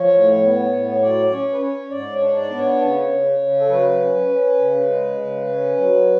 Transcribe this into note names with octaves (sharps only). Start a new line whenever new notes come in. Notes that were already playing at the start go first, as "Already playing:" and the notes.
Already playing: F3 C#5
A2
B3
A2
F#3 D5
C#4 C#5
B4
C#4 C#5
G#2 D5
C#5
D4
D5
B3
C#5
C#3
C#3
C#3
A4
F#3 B4
C#4
C#4
C#3
G#3
C#3
C#4
F#3